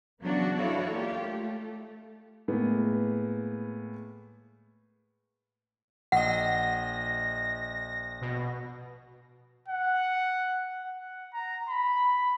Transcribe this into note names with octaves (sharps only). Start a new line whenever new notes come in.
C#3 E3 F#3 B3 D4 F#4
E4 F#4 A4 C#5 D5 F5
A#3 F4 G4
A3
A2 G#3 A#3 B3
A#1 D#5 F#5 A#6
B2
F#5
F#5
A#5
B5